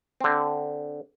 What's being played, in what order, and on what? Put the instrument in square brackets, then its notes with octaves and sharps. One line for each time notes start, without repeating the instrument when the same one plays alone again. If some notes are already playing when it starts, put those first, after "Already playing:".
[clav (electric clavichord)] D3 C4